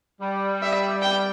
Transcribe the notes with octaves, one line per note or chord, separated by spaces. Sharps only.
G3
E5
G5